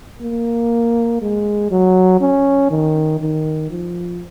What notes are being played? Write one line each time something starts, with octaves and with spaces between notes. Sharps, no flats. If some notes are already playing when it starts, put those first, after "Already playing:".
A#3
G#3
F#3
C#4
D#3
D#3
F3